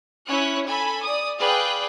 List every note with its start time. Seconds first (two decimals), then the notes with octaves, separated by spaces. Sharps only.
0.28 C#4 E4 C#5 F#6
0.66 A4 G#5 B5
1.05 D5 D#6
1.39 G#4 B4 D5 F5 G5 F#6